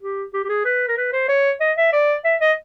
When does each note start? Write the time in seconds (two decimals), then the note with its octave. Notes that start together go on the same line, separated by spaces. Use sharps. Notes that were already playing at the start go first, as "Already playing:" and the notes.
0.02 G4
0.34 G4
0.44 G4
0.49 G#4
0.65 B4
0.88 A#4
0.97 B4
1.13 C5
1.29 C#5
1.61 D#5
1.77 E5
1.93 D5
2.25 E5
2.41 D#5